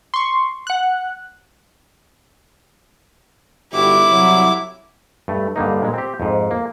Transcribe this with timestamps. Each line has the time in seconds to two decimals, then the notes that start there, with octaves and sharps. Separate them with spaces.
0.14 C6 C#6
0.67 F#5 F#6
3.73 G1 E4 F#4 G4 D6
4.09 C2 F#3
5.28 G2 A3
5.56 G2 D3 A#3 D#4
5.82 A#2 G#3
5.94 C4 G4
6.20 F2 G#2
6.51 A#3